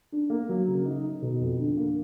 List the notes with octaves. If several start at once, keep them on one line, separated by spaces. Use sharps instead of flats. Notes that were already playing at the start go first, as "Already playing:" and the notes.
D4
A#3
F#3
C#3
D#4
D#4
B2
F2
D3
A#3